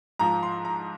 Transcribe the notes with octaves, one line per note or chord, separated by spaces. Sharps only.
G#2 F3 A#5
C6
A#5